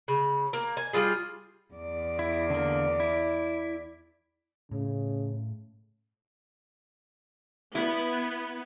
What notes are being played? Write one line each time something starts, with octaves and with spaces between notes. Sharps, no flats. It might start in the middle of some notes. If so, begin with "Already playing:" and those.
C#3
A#3
G#5
G3 G#3 F4 G#4
E2 D5
E4
D3 A#3
E4
A2 C#3
B3 E4